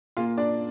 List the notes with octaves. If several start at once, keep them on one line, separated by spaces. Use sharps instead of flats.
A#2 A#3 F4 F5
D4 D5